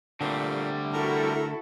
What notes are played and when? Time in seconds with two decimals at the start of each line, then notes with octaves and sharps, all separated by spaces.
0.21 A#2 D3 G3 A3 C4
0.93 E4 F#4 A4 A#4